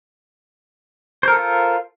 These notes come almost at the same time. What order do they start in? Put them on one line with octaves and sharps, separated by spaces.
C5 A#4 A4 F4